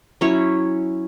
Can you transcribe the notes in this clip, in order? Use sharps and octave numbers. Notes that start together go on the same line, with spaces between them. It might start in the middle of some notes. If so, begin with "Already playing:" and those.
F#3 C#4 E4 C#5